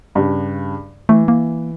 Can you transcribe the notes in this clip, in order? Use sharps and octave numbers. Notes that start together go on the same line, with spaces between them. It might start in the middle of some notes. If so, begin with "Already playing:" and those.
G2 C#3
E3 A3
A#3